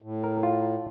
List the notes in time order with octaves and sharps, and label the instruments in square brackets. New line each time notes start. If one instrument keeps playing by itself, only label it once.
[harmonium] A2
[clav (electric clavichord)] A#4
F4